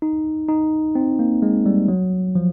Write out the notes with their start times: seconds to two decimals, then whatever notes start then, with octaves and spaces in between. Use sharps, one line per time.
0.02 D#4
0.49 D#4
0.95 C4
1.19 A#3
1.42 G#3
1.66 G3
1.88 F#3
2.35 F3